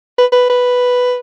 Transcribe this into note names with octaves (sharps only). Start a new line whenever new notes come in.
B4
B4
B4